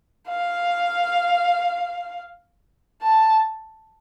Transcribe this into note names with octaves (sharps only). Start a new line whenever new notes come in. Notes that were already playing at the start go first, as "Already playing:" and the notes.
F5
A5